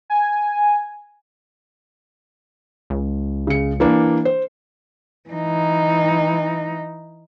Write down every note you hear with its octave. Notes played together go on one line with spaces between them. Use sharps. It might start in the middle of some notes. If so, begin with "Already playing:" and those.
G#5
C#2
C#3 C#7
E3 A#3 D4
C5
E3 D#4